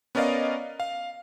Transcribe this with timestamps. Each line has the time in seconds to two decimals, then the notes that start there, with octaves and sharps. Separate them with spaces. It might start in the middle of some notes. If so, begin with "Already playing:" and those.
0.15 B3 C#4 A#4 D5 D#5 F5
0.80 F5